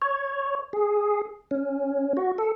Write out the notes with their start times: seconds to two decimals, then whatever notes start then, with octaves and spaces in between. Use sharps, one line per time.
0.02 C#5
0.73 G#4
1.51 C#4
2.17 F#4
2.38 A4